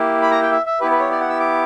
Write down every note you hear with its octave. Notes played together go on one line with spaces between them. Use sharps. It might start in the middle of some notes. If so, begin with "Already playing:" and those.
Already playing: A#3 E4 G4
B5
A#5
G5
E5
E5
B3 E4 G4 B4
B4
C#5
D5
F#5
E6
D6